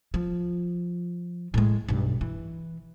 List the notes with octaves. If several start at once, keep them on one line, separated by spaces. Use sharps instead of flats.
F3
A2 G#3
B1 G2
E3